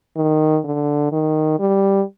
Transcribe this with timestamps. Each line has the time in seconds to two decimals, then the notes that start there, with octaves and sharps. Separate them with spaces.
0.17 D#3
0.64 D3
1.12 D#3
1.60 G3